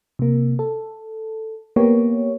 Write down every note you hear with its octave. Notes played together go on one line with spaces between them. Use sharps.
C3 A#3
A4
A#3 B3 G4 C#5